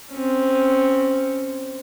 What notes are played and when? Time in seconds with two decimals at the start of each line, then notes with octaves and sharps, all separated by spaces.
0.12 C4 C#4